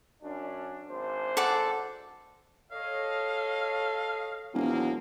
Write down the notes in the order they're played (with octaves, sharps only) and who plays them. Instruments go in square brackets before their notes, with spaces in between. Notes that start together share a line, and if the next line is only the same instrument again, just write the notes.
[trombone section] F#2 C#4 D4
G#1 D4 C5
[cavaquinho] A4 D5 F#5
[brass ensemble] A4 C#5 D#5 [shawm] F5
[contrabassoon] E1 [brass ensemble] F3 F#3 A#3